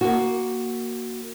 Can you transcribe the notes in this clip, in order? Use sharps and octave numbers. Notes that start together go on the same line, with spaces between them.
A#3 F#4